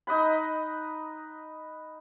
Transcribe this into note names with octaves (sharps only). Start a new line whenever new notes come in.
D#4 D#5 F#5 B5